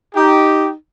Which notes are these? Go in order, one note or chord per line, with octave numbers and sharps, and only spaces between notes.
D#4 G4